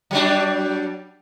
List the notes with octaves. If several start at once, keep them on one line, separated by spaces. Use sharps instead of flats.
F#3 G3 D4